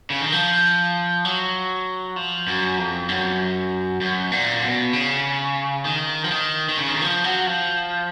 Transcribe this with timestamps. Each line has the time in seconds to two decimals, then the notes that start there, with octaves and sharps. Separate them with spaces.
0.10 C#3
0.21 D#3
0.32 F3
1.25 F#3
2.16 F3
2.47 F#2
2.78 F2
3.08 F#2
4.01 F#2
4.32 A#2
4.62 B2
4.93 C#3
5.85 D#3
6.25 F3
6.31 D#3
6.69 D#3
6.78 C#3
6.89 D#3
7.01 F3
7.24 F#3
7.47 F3